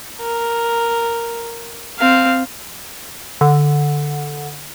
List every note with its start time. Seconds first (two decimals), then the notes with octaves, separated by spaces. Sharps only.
0.21 A#4
1.99 C4 F5
3.41 D3